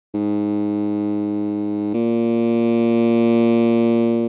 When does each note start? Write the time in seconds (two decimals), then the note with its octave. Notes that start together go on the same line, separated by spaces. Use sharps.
0.14 G#2
1.94 A#2